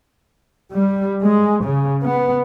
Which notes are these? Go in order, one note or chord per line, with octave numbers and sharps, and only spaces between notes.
G3
G#3
C#3
B3